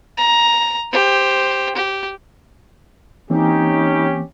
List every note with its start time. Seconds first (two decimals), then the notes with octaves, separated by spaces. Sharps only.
0.17 A#5
0.92 G4 C5
1.76 G4
3.30 E3 A#3 C4 C#4 D#4 G4